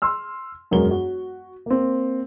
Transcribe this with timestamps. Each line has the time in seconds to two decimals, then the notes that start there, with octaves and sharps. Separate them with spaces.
0.02 C6 E6 F6
0.71 E1 F#2 G#3 F#4 A#4 G7
0.91 F#4
1.66 A#3 C4